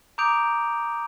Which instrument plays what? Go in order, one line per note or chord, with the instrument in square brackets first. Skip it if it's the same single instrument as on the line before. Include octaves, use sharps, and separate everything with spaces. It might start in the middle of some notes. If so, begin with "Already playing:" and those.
[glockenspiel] A#5 D6 D#6 G6 D7 F7